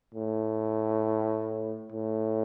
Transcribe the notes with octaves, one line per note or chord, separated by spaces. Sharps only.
A2
A2